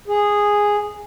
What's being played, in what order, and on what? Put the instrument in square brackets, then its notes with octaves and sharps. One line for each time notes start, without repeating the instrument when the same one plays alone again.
[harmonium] G#4